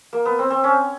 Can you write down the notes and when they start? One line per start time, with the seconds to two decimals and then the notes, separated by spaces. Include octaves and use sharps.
0.13 A#3
0.25 B3
0.39 C4
0.50 C4
0.64 C#4